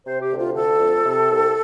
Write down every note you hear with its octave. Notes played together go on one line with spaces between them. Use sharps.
C3 C5
G4
D2
F4
D3 A4
F2
C3
C2